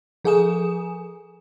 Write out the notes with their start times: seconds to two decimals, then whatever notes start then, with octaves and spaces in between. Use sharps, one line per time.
0.25 F3 G#4 A4 G#5 D#6 E7